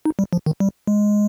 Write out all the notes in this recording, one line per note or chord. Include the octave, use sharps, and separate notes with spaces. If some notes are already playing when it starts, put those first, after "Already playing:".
D#4
G3
F3
D#3
G3
G#3